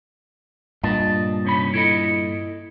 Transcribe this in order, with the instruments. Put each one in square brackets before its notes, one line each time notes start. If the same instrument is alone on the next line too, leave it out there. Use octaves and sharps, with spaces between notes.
[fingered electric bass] G2 A#2 [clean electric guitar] D#5 A5
[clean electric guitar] C3 C#4 B5
E4 A4 D#5